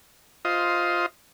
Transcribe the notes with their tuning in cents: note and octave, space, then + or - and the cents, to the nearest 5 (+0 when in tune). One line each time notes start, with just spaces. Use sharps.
F4 +0 C5 +0 D#5 +15